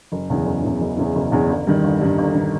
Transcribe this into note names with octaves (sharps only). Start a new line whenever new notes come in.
F#1
E2 C#3 E3
F#1
E2 C#3 E3
F#1
E2 C#3 E3
F#1
E2 C#3 E3
G1
G2 D#3
G1
G2 D#3
G1
D#3